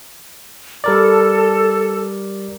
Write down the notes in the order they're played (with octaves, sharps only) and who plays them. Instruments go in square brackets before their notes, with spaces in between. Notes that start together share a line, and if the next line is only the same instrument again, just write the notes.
[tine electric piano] G3 A#4 D5 [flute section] A4